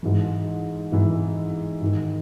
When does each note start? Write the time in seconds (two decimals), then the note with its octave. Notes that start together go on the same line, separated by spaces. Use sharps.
0.03 G#2 E3
0.92 G#2 E3
1.82 G#2 D#3